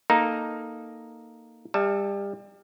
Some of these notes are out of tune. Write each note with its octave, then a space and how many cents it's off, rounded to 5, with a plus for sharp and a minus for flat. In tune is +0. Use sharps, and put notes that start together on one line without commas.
A#3 +0 D#4 +0 A4 +0
G3 +30 E5 +0 A5 +0